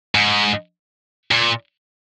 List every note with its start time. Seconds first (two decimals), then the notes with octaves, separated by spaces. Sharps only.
0.15 G#2
1.31 A#2